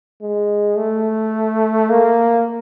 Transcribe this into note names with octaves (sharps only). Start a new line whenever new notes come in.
G#3
A3
A#3